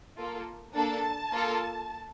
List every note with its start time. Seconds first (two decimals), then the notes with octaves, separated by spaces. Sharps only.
0.18 A#3 F4 A4
0.75 A#3 D4 A4 A5
1.31 A#3 F4 A4